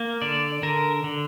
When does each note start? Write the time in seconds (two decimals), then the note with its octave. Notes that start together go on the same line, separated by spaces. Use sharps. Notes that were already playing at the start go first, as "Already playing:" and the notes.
Already playing: A#3
0.22 D3 D5
0.63 D3 A#4
1.04 D3